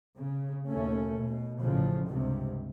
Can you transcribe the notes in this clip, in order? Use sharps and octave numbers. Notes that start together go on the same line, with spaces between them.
C#3
D#2 B2 A3 C#4
B2
A1 C#3 F3
C#2 G2 C3